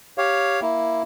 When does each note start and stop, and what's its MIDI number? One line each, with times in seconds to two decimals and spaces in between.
0.18 0.60 67
0.18 0.60 73
0.18 0.60 77
0.62 1.03 58
0.62 1.03 64